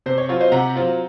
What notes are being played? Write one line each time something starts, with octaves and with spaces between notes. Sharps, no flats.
C3 C5
C#5
F#3 C4 F4 C#5
C5 D#5
C3 F#5 A#5
F#3 C4 F4